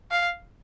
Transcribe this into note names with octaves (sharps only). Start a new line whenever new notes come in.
F5